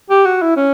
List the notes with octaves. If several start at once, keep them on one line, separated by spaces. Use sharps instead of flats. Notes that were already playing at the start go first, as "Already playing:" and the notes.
G4
F#4
E4
C#4